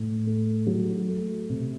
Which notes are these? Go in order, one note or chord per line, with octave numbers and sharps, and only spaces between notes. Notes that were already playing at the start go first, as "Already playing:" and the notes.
Already playing: A2
A3
F#3
A3
C3